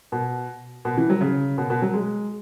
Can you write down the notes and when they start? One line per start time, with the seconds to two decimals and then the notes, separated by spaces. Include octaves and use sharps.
0.12 B2
0.85 B2
0.97 E3
1.10 F#3
1.21 C#3
1.58 B2
1.70 B2
1.82 F#3
1.94 G#3